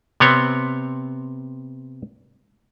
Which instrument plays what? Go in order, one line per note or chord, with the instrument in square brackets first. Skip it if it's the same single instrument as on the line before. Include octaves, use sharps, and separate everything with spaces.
[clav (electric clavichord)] C3 B3 C4 C#5